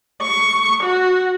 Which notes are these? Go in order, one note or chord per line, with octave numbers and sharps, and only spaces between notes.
C#6
F#4